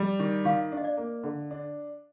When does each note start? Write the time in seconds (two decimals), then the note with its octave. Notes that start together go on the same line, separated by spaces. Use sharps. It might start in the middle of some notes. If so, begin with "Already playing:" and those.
Already playing: G3
0.19 D#3
0.45 D#3 F5
0.72 D4
0.77 D#5
0.84 D5
0.97 A#3
1.24 D3
1.51 D4